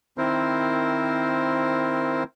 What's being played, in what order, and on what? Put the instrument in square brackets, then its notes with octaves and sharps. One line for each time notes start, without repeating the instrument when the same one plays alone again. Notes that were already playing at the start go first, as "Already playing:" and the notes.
[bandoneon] D#3 C4 E4 A#4 C5